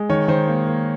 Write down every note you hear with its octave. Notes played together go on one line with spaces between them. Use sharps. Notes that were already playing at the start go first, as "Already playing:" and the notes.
Already playing: G#3
D#3 C#5
D#3 C5
A#3
A#3